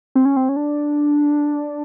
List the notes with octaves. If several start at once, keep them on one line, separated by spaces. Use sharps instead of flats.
C4
C#4
C4
C#4
D4